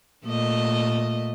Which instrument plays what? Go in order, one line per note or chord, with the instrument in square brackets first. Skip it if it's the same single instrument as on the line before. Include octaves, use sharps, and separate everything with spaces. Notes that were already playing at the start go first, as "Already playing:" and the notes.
[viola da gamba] A#2 A3 D#5